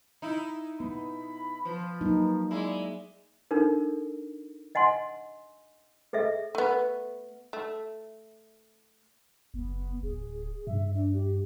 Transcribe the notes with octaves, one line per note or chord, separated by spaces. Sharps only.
D#4 E4
B3 B5
F3 B4
F#3 A#3 D#4
G#3 E4 D5
D4 D#4 A4 A#4
D#5 F#5 G#5 C6
G#4 A4 D#5 E5
A3 B3
A3
F#1 B3
D1 G#4
G2 E5
D4
G4